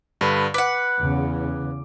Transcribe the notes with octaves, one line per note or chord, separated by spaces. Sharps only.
G2 D3 B4
B4 F#5 D6
E2 C#3